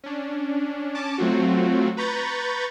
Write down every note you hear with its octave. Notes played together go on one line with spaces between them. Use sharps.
C#4 D4
C#4 A5 D6
F#3 A3 C4 F4 F#4
B4 A#5 B5 C#6 G6 A6